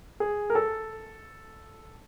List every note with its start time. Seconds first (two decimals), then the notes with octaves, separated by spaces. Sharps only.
0.20 G#4
0.50 A#4
0.55 A4